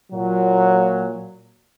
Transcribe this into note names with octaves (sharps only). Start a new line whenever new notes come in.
A#2 F#3